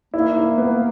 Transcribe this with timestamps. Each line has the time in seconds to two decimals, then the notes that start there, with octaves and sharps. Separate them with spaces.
0.14 A#3 E4
0.36 E4
0.58 B3